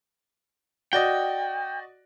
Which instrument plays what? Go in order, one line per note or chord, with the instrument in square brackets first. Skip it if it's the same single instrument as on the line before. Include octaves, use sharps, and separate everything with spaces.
[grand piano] F#4 D5 D#5 [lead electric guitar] G5